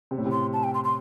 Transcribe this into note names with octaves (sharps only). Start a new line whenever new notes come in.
C3
A2
C3
C6
A5
G5
C6
C6